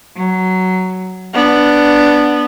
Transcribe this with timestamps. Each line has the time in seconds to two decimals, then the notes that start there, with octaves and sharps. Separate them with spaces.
0.16 F#3
1.33 B3 D4